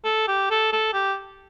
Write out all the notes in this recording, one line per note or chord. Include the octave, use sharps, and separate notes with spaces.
A4
G4
A4
A4
G4